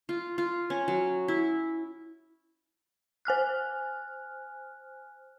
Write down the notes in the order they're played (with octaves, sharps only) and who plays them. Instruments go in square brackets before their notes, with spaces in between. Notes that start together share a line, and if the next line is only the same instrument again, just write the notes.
[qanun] F4
F4
C#4
F#3
E4
[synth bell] C5 G#5 F6 F#6